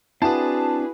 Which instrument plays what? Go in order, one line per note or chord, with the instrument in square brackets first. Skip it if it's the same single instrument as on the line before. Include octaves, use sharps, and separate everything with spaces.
[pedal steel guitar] C4 D4 D#6 [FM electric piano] E4 F#4 [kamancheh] G#4 B4 [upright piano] A5